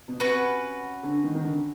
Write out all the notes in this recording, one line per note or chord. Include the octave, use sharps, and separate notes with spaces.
B2
C3 C#4 F#4 B4
D3
D#3
D#3
D3